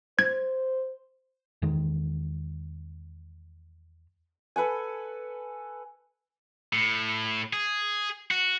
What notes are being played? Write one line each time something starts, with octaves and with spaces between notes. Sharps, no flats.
C5 G#6
E2 D#3 G#3
A4 B4 F#5 G#5
A2
G#4
F#4